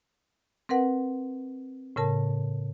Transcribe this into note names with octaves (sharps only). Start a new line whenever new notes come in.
C4 A#4 B4 F#5
A2 C#3 A#4 A5